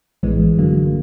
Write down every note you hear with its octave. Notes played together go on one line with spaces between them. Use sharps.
A#1 A2 E3 G#3 B3
G2 D3 F#3 A#3